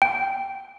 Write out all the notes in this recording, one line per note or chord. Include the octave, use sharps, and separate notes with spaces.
G5